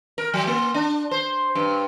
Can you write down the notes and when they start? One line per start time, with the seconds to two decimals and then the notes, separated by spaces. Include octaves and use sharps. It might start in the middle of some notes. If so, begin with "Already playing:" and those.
0.18 A#4
0.34 F#3
0.47 A#3
0.74 D4
1.11 C5
1.55 G2